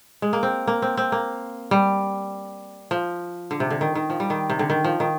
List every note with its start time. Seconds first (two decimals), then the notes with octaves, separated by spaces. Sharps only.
0.22 G#3
0.33 A#3
0.43 C4
0.67 A#3
0.82 C4
0.97 C4
1.12 A#3
1.71 G3
2.91 F3
3.51 D3
3.60 C3
3.70 D3
3.81 D#3
3.95 D#3
4.10 F3
4.20 G3
4.30 D#3
4.50 C3
4.59 D3
4.70 D#3
4.84 F3
5.00 D#3